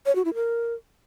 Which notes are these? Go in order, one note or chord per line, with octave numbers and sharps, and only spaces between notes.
C#5
F#4
E4
A#4